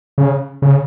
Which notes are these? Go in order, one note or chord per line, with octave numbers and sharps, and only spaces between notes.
C#3
C#3